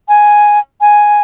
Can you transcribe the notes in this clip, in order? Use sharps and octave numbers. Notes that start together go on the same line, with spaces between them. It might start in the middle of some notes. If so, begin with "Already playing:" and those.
G#5
G#5